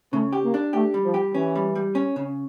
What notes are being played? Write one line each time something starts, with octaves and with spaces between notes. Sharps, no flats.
C#3 A3
G4
A#3
D4
A3 G4
G3
F3
G4
E3 C#4
G3
G3
C#4
C#3